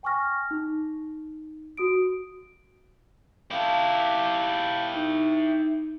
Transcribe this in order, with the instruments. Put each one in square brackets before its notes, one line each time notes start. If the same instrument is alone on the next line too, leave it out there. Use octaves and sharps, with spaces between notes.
[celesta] G5 G#5 C#6 D6 F6 A#6
D#4
F#4 D#6 D7
[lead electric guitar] E4 G4 [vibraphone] F5 A5
[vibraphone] D#4